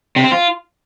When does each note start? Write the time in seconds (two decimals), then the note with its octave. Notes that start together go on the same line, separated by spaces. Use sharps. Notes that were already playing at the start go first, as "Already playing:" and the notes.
0.16 C3
0.24 C4
0.32 F4